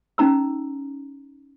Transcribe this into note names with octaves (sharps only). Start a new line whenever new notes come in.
C#4 D#4 A#5 E6